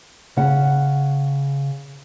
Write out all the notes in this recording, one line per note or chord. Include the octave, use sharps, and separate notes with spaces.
C#3 F#5